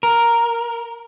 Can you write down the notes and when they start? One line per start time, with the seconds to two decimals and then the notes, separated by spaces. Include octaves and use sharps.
0.03 A#4